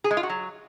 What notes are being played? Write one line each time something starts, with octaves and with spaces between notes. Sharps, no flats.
G#4
G#3
F4
F#4
F#3